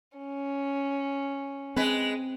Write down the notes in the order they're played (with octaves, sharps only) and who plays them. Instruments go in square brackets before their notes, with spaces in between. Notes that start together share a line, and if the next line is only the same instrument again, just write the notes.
[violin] C#4
[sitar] G#3 B4 [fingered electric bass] C4